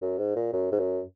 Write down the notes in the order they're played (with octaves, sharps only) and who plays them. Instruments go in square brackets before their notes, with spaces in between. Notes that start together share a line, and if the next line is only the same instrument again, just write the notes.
[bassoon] F#2
G#2
A#2
F#2
G#2
F#2